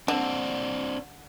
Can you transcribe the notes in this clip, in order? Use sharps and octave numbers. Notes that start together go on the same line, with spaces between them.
D3 C4 D4